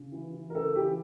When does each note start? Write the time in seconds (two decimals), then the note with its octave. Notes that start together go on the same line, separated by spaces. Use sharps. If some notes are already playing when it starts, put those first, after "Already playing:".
Already playing: C#3
0.12 E3
0.33 E3
0.50 A#4
0.54 C#3 A4
0.75 E3 G4